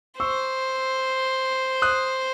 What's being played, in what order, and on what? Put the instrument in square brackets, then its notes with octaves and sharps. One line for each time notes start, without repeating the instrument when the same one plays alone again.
[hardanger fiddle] C5 [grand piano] C#6 E6
[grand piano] D#6 F#6